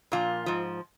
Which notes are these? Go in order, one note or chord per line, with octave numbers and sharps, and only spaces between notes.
A#2 F3 F4
G#2 F3